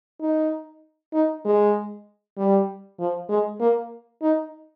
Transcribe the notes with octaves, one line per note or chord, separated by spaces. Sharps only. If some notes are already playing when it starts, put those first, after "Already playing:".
D#4
D#4
G#3
G3
F3
G#3
A#3
D#4